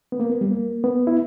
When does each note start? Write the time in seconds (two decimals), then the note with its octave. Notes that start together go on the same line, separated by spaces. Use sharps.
0.12 B3
0.20 A#3
0.30 B3
0.41 G3
0.52 A#3
0.84 B3
1.07 E4